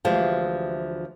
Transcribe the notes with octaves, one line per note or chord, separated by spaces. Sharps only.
D2 E3 F3 G#3 G4